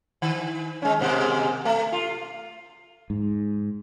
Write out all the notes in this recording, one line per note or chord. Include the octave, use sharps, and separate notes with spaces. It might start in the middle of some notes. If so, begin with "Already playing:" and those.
D#3
G#3 C#4
D#2 G#2 B2
A3
F4
G#2